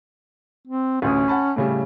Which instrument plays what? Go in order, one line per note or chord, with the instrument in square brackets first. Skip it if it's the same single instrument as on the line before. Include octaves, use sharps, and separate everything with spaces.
[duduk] C4
[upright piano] A1 D2 D#6 [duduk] C#4
[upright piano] F#5 A5 B5
A2 C#3 G3